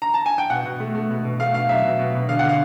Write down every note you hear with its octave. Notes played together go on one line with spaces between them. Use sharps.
A#5
A5
G#5
G5
B2 F#5
B2
A3
A3
B2
B2
A3 F5
B2 F5
F#3 E5
B2
B2
B2
D3 F5
D3 F#5
F5